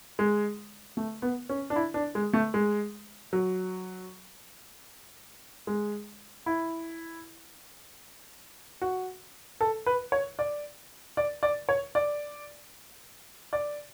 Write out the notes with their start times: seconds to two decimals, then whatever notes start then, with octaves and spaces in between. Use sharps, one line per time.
0.19 G#3
0.97 A3
1.22 B3
1.49 C#4
1.70 D4
1.76 E4
1.94 D4
2.15 G#3
2.34 A3
2.54 G#3
3.33 F#3
5.67 G#3
6.46 E4
8.82 F#4
9.61 A4
9.86 B4
10.12 C#5
10.39 D5
11.17 D5
11.43 D5
11.69 C#5
11.95 D5
13.53 D5